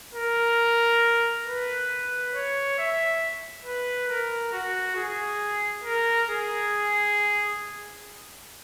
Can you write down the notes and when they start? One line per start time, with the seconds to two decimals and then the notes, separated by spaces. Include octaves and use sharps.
0.14 A#4
1.47 B4
2.34 C#5
2.78 E5
3.65 B4
4.09 A#4
4.52 F#4
4.96 G#4
5.84 A#4
6.28 G#4